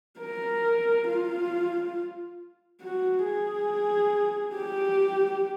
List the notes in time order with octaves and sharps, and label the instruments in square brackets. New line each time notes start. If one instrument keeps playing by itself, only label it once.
[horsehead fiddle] A#4
F4
F#4
G#4
G4